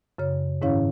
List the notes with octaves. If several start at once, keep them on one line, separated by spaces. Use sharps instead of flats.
F#2 C#3 C#5
G#2 D#3 C#4 E4 C#5 F5